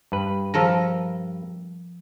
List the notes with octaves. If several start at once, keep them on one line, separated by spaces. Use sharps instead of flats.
G2 B4
F3 A4 A#4